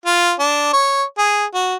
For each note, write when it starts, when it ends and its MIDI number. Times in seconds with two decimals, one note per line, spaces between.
0.06 0.32 65
0.40 0.72 62
0.73 1.03 73
1.18 1.45 68
1.54 1.75 66